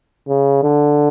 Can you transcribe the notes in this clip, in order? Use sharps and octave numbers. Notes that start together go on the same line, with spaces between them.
C#3
D3